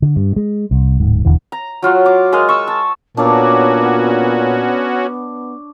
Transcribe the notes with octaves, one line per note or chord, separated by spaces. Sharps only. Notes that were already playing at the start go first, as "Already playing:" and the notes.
D3
G2
G#3
C2
D1 G#2
E1 D#2 D3 E3
A#5
F#3 F4 F#4
D6
G#3 A#4 D#5 F5
C#6 E6
A5
A#2 B3 C#4 D4 F#4 C#5 D5